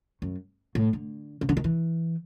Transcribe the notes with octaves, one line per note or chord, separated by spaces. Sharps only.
F#2
A2
D3
C#3
D3
D#3
E3